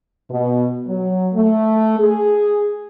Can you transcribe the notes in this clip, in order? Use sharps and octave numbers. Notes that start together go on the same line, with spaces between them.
B2
F#3
A3
G#4